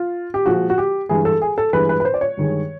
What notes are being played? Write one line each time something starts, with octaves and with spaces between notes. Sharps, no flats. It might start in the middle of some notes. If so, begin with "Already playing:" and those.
Already playing: F4
G4
A#2 F3 G#3 F#4
F#4
G4
G2 E3 G#3 G#4
A4
G#4
A4
G2 E3 G#3 B4
B4
B4
C5
D5
C#5
G2 D#3 G#3